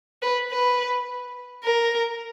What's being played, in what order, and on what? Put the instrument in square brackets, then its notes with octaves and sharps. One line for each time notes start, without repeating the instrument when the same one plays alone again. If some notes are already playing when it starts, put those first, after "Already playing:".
[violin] B4
B4
A#4